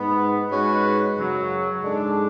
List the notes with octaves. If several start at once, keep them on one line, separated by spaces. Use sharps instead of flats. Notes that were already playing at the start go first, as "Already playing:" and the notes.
Already playing: G#2 G#3 B3
G#2 G#3 C#4 F#4 B4
F#2 C#3 F#3
G#2 G#3 D4 A4